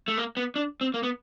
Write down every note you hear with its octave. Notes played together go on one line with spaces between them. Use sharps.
A3
A#3
B3
D4
C4
A#3
B3